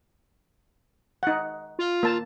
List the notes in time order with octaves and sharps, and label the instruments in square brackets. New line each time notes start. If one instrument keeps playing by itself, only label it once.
[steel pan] D#4 F#5
[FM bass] F4
[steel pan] A#3 A5